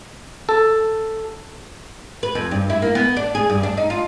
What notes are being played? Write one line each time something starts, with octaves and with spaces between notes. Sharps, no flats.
A4
B4
F2
G2
E4
A#3
B3
D4
G#4
G2
D4
D#4
F4